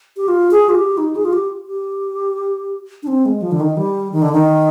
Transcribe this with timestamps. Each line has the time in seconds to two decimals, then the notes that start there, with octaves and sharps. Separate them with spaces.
0.17 G4
0.28 F4
0.51 G#4
0.69 F4
0.75 G4
0.97 D#4
1.16 G#4
1.25 F4
1.33 G4
1.67 G4
3.03 D4
3.07 C4
3.25 G#3
3.42 F3
3.51 D3
3.60 D#3
3.77 G3
4.12 D#3
4.22 D3
4.32 D#3